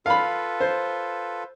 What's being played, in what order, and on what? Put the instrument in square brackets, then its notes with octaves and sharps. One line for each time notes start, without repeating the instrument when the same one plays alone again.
[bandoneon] F4 A4 B4 [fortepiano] F5 B5
[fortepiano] C5